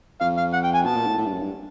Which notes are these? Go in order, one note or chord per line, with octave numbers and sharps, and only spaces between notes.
F2 F5
F5
F#5
G5
G#5
B2 A5
A#2
A2
A2
G2
F#2
G2